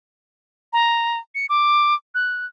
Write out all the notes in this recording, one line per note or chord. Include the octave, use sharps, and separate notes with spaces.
A#5
C#7
D6
F#6